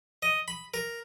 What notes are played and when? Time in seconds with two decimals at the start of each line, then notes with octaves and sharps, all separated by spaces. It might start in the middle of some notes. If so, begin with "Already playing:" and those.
0.22 D#5
0.48 B5
0.74 A#4